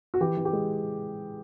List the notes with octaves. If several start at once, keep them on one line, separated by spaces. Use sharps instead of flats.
F#4
E3 G4
E3
G4
G#3